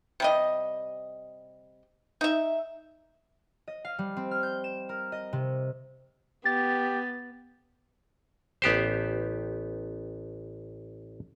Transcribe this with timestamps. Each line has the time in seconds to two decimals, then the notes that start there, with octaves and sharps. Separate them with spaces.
0.20 C3 G3 D#5
2.21 D#4 E5
3.68 D#5
3.85 F5
3.99 G3
4.16 C4
4.31 F6
4.43 G6
4.64 E7
4.89 A#4
5.12 D#5
5.33 C3
6.45 B3 G4 A6
8.62 A1 B3 G4 C5